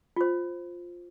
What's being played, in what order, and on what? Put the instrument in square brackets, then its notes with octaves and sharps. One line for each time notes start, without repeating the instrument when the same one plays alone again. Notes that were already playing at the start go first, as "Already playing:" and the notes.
[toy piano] F4 C5